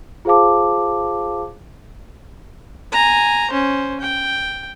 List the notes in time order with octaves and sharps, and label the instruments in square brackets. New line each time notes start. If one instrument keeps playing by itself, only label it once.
[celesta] F4 G#4 C5 F5 A5 D6
[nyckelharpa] G#5 A#5
C#4 C5
G5